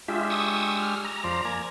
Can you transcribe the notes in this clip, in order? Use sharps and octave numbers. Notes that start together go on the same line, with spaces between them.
G#3 D4 F4 G4 E5
C#6 D#6 E6
F6
A#5
F2 C5 D5
A#3 D5 G#5